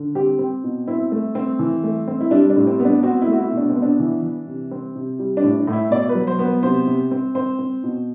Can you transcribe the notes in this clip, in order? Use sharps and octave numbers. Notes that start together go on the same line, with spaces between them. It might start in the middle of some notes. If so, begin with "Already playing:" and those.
Already playing: D3
C4 G4
C4
B2
C4 E4
A3
C4
E3
A3
C4
E4
G3 D4
D4
A2
C4
B3
D4
C4 F#4
E4
A3 F#4
E4
B2
D4
C4
B3
D4
E3
E3
C3
C4
C3
G3
D4
A2
D4
A2
E4
B2 D5
B4
F#3
C5
B3
B4
C3 C5
C3
C4
C4 C5
C4
B2